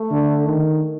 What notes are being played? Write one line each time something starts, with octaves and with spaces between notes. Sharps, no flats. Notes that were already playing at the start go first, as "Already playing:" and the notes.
Already playing: A3
D3
D#3